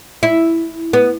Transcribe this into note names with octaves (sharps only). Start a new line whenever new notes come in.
E4
B3